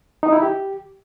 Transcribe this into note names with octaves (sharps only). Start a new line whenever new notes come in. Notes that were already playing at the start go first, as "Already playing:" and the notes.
D#4
E4
G4